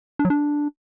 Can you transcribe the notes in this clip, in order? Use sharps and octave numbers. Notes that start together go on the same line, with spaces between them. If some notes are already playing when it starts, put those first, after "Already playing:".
D4
F#3
D4